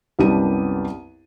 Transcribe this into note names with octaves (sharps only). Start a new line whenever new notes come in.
C2 F#2 B3 G4 A5 D#7